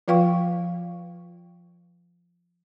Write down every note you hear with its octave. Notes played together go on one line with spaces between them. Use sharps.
F3 F4 B4 F5 G5 C#6